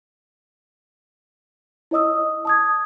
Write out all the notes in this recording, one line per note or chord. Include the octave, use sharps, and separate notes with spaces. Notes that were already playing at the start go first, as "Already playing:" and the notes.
E4 C#5 D#5 D#6 E6
A5 D#6 G#6